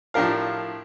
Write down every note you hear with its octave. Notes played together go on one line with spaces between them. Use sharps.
A2 F3 D4 G4 A#4 F5